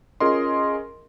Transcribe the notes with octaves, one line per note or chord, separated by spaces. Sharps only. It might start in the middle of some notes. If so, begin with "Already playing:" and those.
C#4 F4 G#4 A#4 D#5 C6